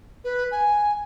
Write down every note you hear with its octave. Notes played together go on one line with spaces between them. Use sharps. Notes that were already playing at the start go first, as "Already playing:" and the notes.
B4
G#5